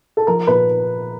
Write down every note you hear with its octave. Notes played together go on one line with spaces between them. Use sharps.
A4
F3 A#4
A#2 B4